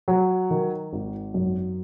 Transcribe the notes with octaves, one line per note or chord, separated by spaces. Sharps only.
F#3
D#3
G#1
F#2